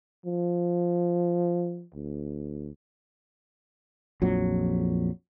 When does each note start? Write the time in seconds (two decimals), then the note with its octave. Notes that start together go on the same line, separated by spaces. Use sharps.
0.26 F3
1.94 D2
4.22 A#1 F2 F#3